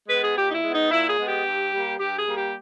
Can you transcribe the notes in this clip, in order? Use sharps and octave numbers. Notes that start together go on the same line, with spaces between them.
G#3 B3 B4
G#4
A#2 G4
D#4
E4
G#3 B3
D#4
A#2 E4
G#4
G#3 B3
G4
G2
G3 A#3
G2 G4
G#4
G3 A#3
G4